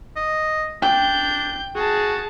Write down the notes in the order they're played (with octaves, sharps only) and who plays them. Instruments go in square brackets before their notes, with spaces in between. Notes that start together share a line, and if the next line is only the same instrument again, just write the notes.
[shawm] D#5
[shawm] D4 [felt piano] G5 [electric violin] G6
[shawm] F#4 [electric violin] G#4 A5